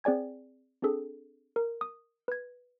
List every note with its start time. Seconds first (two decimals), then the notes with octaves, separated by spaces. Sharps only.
0.04 C4 G#4 D5 G#5 G#6
0.82 C4 D4 G#4 A4
1.56 A#4
1.81 D#6
2.28 B4 G#6